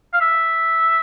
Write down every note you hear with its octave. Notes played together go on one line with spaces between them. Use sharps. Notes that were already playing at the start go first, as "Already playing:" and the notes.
F5
E5